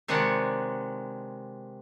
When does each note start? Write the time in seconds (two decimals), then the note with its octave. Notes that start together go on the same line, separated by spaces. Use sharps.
0.08 C3 D#3 G#3 D4 C#5 F#5